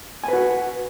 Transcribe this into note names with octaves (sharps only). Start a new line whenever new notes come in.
F#4 B4 G#5